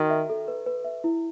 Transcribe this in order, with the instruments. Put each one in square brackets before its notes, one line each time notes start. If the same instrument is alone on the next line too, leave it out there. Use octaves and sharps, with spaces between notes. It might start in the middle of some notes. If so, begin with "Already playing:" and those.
Already playing: [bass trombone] D#3 [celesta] F#4
[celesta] E5
A4
B4
B4
E5
E4